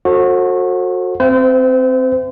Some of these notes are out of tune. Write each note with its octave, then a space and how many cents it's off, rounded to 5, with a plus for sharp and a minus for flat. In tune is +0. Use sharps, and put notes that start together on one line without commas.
F#4 -25 A4 +20 C5 +35
C4 +0 C5 -35 E5 +45